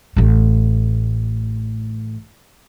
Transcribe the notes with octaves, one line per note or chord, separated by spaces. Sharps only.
A1 A3